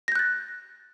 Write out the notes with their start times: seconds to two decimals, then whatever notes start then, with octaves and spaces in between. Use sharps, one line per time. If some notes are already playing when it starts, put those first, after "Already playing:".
0.08 A#6
0.12 G6
0.15 F#6
0.19 A6